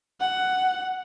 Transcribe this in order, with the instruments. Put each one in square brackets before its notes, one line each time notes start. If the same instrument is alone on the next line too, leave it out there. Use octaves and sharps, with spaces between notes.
[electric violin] F#5